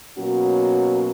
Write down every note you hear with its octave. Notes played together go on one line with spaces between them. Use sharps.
B2 F#3 A#3 C#4 F#4